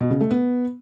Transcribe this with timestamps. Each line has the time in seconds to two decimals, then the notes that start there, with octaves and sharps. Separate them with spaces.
0.01 B2
0.11 C#3
0.21 A3
0.31 B3